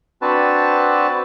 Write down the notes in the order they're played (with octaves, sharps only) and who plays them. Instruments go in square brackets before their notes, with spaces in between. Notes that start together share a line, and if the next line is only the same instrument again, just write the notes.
[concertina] C4 D4 F#4 B4 A5